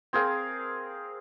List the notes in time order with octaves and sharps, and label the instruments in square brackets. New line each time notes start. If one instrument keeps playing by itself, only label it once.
[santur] C4 G#4 A#4 F5